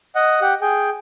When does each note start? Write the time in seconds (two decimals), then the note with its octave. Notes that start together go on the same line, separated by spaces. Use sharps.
0.15 D#5 F#5
0.41 G4 F#5
0.61 G#4 G5